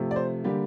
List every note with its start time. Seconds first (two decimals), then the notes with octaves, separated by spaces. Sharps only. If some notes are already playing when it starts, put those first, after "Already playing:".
Already playing: C3 F3 A3
0.11 D5
0.16 C5
0.44 D3 G3 A#3 G4